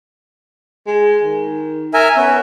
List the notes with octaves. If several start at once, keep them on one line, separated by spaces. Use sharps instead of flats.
G#3
D#3
A#4 E5 G#5
B3 C#4